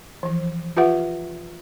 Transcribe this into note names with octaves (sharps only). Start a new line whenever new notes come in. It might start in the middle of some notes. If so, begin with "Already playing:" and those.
E3 F3
F4 G4 B4 E5 F#5